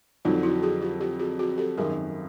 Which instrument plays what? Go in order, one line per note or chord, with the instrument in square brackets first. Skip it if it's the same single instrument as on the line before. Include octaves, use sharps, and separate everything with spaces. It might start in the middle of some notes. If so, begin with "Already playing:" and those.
[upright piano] F2 D3 F#3 [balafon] D#4 F4
[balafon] E4 F#4
F#4 G#4
F4 G4
F4 G4
F#4 G#4
F#4 G#4
G4 A4
[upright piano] G#1 F#2 D#3 [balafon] G#4 A#4